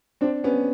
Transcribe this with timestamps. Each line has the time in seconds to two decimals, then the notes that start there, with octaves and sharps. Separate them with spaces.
0.21 C4 D4
0.44 B3 C#4